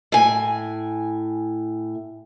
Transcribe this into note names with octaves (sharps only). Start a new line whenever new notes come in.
A2 G#5